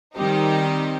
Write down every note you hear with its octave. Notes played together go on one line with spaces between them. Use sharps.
D#3 G3 C4 D#4 G4